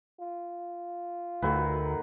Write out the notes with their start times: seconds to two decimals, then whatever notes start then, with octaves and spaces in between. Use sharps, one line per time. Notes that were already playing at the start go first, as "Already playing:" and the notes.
0.20 F4
1.42 D2 D#3 F#3 B4